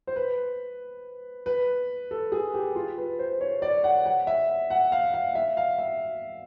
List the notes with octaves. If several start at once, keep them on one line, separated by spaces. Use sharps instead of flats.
C5
B4
B4
A4
G#4
G4
F4
B4
C5
C#5
D5
F#5
F#5
E5
F#5
F5
F5
E5
F5
E5